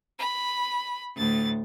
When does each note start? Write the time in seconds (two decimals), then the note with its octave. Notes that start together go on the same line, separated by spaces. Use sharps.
0.18 B5
1.15 D2 A2 A6